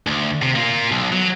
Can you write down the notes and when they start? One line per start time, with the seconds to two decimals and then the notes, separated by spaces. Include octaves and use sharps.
0.07 D2
0.42 C3
0.56 A#3 F4
0.91 B1
1.12 F#3